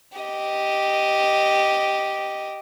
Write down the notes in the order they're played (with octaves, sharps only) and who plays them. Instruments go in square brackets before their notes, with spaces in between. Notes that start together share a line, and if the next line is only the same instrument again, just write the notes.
[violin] G4 D#5